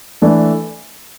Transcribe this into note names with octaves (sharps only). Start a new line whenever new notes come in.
E3 A3 D4